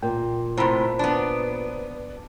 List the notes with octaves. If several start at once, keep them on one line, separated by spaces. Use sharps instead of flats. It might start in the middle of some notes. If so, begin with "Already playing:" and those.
A#2 G5
A2 C3 C5 A#5 B5
B3 D4